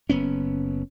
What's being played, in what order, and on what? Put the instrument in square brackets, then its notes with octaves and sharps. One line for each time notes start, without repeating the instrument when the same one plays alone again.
[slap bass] F#1 B3 C#4